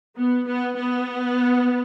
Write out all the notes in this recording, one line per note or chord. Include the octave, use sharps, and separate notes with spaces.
B3
B3
B3